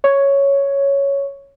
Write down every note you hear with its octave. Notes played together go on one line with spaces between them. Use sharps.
C#5